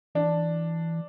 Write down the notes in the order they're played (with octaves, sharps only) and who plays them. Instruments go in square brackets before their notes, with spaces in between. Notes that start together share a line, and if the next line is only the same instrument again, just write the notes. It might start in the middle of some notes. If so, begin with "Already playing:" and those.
[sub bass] E3 [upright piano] D4